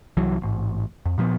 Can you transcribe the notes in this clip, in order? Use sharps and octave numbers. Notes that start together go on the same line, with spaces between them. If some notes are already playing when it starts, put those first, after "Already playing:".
C2 E3 F#3
A1 G#2
F2
A#2 F3 G#3 B3